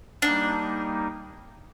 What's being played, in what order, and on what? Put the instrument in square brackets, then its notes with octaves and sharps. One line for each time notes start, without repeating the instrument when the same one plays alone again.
[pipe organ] G3 A#3 D#4 [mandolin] D4